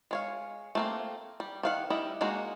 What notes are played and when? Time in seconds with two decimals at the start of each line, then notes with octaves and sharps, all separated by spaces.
0.11 G#3 C#5 F5
0.75 A3 A#3 C4
1.40 G3
1.63 D#3 F5 F#5
1.90 G3 E4 D#5
2.21 G#3 A#3 D#4 F#4